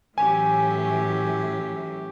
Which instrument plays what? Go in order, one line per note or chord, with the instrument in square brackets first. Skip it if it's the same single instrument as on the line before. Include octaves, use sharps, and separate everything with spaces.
[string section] A2 E3 F#3 [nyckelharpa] C#4 G4 [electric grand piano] G#5